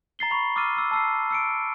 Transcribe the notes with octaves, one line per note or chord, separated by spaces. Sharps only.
A#5 A6 C7 G7
B5 C#6
D6 E6 F6 A6 D#7
D6 E6
A5 E6 C7
E6 C#7 D7